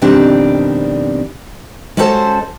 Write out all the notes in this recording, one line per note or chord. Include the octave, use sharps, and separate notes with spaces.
F2 B2 D#3 G3 C4 D4
G#3 C#4 F#4 A4 C5 A5